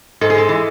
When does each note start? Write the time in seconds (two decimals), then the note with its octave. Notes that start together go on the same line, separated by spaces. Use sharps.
0.21 G#2 A4
0.30 G#4
0.35 G#3 A4
0.49 E3